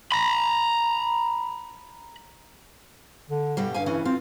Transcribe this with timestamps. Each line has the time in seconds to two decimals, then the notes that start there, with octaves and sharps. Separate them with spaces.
0.12 A#5 B5
3.29 D3
3.57 G2 B2 G3
3.74 G2 C#4 F5 G#5
3.86 C#3 E3 C#4
4.05 C4 F4